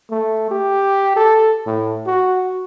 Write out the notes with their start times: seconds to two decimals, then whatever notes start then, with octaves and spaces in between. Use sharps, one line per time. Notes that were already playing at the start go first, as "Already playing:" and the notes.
0.11 A3
0.51 G4
1.16 A4
1.66 A2
2.07 F#4